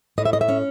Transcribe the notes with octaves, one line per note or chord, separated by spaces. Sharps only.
A2 D#5
E5
D#5
E5
C#4